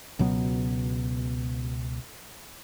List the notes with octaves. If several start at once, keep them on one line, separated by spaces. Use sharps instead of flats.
C#2 B2 F#3 B3